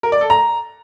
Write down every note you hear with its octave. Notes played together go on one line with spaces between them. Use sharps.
A#4
D5
A4
A#5